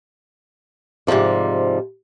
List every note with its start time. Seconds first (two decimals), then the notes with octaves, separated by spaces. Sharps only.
1.07 G#2 C3 D#3 F3 G3